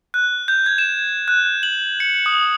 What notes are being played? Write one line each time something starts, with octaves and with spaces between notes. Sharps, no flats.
F#6
G6
G#6
E7
F#6
F#7
C#7
D#6